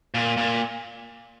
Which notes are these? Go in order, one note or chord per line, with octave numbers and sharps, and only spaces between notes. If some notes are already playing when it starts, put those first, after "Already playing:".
A#2
A#2